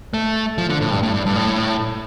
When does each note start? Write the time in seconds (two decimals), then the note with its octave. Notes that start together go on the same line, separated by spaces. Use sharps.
0.14 A3
0.58 F3
0.69 D3
0.81 A2
0.91 G2
1.03 A2
1.14 G2
1.26 G2
1.36 A2